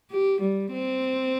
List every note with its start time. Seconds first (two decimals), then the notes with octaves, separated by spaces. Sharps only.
0.11 G4
0.42 G3
0.73 C4